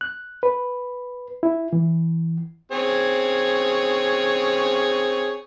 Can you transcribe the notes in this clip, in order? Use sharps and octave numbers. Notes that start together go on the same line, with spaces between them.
F#6
B4
E4
E3
C4 G#4 C#5